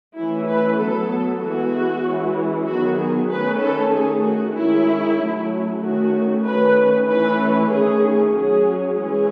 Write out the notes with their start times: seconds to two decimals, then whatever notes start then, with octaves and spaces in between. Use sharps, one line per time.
0.16 E3 A3 C#4 E4
0.47 B4
0.79 F#3 B3 A4
1.41 E3 G#3 B3 F#4
2.04 E3 G#3 C#4
2.67 D#3 F#3 B3 F#4
2.98 G#4
3.30 D#3 A3 C#4 B4
3.61 A4
3.92 D#3 A3 C#4 G#4
4.24 F#4
4.55 D#3 G#3 C#4 E4
5.18 F#3 A3 C#4
5.81 D#3 A3 C#4 F#4
6.44 D#3 A3 C#4 B4
7.07 E3 A3 C#4 B4
7.69 D#3 A3 C#4 G#4
8.33 F#3 C#4 G#4
8.95 E3 G#3 C#4 G#4